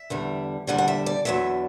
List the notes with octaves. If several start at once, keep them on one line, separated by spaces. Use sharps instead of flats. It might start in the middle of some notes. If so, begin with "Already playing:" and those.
Already playing: E5
E2 D3 G3
E2 D3 G3 F#5
F#5
E5
D5
E2 D3 F#3 A3 E5